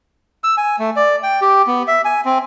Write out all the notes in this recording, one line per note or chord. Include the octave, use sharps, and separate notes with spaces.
E6
G#5
A3
D5
G5
G4
B3
E5
G#5
C4